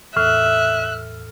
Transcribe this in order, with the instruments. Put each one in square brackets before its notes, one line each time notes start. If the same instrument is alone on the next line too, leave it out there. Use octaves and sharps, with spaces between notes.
[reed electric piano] E2 F6 [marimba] A2 [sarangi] E5 [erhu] F#6